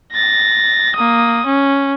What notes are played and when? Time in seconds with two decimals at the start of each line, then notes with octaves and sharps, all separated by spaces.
0.13 A6 A#6
0.95 A#3 D#6
1.46 C#4